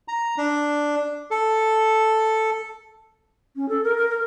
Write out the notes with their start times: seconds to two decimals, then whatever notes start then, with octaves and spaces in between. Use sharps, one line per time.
0.08 A#5
0.38 D4
1.31 A4
3.56 C#4
3.69 A4
3.84 A#4
3.97 A#4
4.09 A#4